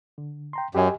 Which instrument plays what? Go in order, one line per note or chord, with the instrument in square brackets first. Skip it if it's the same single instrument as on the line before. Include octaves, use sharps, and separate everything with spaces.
[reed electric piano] D3
G5 A#5 C6
[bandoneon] F#2 [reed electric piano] G4 D#5 G#5